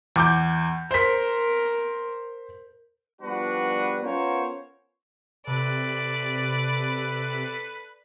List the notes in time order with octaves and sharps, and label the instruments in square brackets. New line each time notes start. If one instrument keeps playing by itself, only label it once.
[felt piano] E2 D6 G6
[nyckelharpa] A#4 [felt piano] C5 B6
[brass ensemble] F3 G3 B3 D4 F#4 B4
B3 C#4 F4 A#4 C5 C#5
[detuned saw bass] C3 [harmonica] A4 B4 [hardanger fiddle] D5